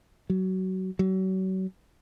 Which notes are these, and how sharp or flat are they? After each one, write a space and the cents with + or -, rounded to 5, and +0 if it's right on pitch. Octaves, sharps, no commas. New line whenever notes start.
F#3 +20
F#3 +35